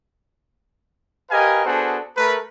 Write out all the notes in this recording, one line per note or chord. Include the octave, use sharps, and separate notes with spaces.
G4 A#4 B4 D#5 F5 G#5
B3 D4 F#4 G#4 A4 C5
A3 A#4 B4